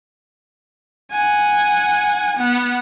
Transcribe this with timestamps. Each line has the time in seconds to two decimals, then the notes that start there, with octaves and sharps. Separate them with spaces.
1.11 F#5 G#5
2.38 B3 F#5